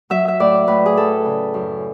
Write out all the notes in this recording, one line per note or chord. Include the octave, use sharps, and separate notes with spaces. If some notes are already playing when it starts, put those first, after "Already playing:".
F#3 E5
E5
A2 D5
A2 B4
G#4
A3 A4
C#3
F#2